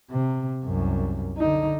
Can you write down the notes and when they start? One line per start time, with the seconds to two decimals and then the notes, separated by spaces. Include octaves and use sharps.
0.11 C3
0.65 C2 F#2
1.38 D3 D#4